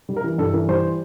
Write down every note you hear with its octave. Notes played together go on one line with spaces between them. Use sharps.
G3
A#4
E3
G2 A4
E3 A#4
G3 C5